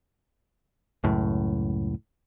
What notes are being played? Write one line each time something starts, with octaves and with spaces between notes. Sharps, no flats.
C#2 F#2 A2